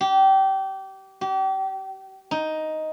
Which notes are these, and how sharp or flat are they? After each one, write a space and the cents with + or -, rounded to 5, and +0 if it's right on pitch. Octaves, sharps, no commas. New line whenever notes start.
G4 -25
G4 -35
D#4 +5